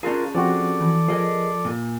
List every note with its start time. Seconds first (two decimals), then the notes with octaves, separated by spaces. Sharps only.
0.03 C#4 D4 F4 G#4 A#4
0.35 F3 C4 F#4 A4 D5
0.80 E3
1.09 F3 G#4 A#4 D#5
1.65 A#2